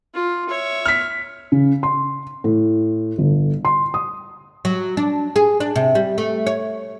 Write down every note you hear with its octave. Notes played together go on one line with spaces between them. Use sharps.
F4
C#5 E5
F6 B6
C#3
C6
A2
G1
C6
D#6
F#3
D4
G#4
D4
C3
G3
A3
C#5